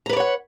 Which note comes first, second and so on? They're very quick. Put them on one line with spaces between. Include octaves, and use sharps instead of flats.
A#5 B4 D5 C#5 F#5